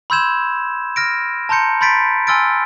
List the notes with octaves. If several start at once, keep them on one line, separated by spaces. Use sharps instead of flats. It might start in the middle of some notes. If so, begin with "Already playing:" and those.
B5 C6 E6 G6 G#6 E7
F6 A#6 D7
A5 A#5 C6 G6 C#7
B5 C6 G6 A6 B6 D7
G#5 C6 E6 F6 A6 D7